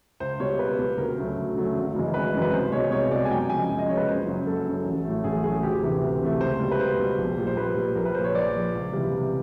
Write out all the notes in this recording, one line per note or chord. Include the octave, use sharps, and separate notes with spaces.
C#2 C5
B2 G3 C#5
C#2 B4
B2 G3
D2 A#4
C#3 F#3 A3
D2
C#3 F#3 A3
G#1
F#2 C#3 E3 G#3
G#1 B4
F#2 C#3 E3 G#3
B4
C2 C5
B2 G#3 C#5
C2 C#5
B2 G#3 D5
G#5
F#2 G5
C#3 F3 G#3 G#5
F#2
D#5
C#3 F3 G#3 C#5
B4
F#1 C5
F#2 C#3 F#3
F#1 A4
F#2 C#3 F#3
A1
A2 F#3 A3
A1 G#4
A2 F#3 A3 G#4
D2 G4
C3 E3 A3
D2
C3 E3 A3
C#2 C5
B2 G3
B4
C#2 C5
B2 G3
A#1
A#2 G3
C5
A#1 B4
A#2 G3
A#1 A#4
B4
A#2 F3 C5
C#5
A#1 D5
A#2 F3
C#2
C3 E3 G3
C#2